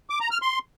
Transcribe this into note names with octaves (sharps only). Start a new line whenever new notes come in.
D6
A#5
F6
C6